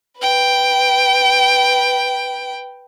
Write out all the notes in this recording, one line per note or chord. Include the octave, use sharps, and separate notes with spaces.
B4 G5